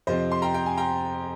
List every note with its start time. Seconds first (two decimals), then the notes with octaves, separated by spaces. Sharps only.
0.07 F2 C3 F3 C4 C5 D#5
0.31 C6
0.42 G5 A#5
0.54 G5
0.66 G#5
0.77 G5 A#5